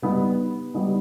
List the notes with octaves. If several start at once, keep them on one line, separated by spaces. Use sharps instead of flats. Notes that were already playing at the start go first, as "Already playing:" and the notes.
G3 B3 D#4
G3 B3 D#4